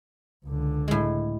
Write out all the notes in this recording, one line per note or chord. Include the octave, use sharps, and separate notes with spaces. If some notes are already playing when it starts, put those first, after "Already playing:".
C#2 D3
A2 G#3